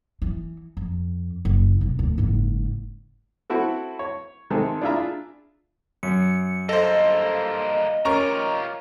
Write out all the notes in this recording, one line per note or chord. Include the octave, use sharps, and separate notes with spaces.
E3
F2
F#1
E1 F2
D2
F#1 G#2
C4 E4 F#4 A4
C#5
C3 D#3 G#3 C4 G#4 A4
D4 E4 F4 G#4 E5 A#5
F#2 C#7
G2 A#3 A4 C5 D#5
C#4 F4 G4 A#4 A#5 C#6